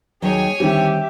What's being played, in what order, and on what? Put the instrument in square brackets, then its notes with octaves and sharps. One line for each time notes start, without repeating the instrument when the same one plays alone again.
[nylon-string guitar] D#2 D#3 F#3 [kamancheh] G#4 [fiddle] C#5 G#5
[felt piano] D3 D#3 G3 [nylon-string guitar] C4 [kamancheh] G4 E5